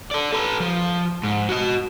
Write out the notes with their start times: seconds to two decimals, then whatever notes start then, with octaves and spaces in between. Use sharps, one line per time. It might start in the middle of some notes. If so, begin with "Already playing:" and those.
0.11 A4 D5
0.33 A4 B4
0.60 F3
1.23 G#2
1.49 F#4 D#5